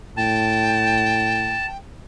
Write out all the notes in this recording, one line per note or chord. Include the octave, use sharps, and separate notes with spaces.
A2 G5 A5